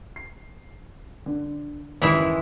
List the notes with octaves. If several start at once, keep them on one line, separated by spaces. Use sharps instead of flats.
C7
D3
F#1 D#2 E3 G#3 E4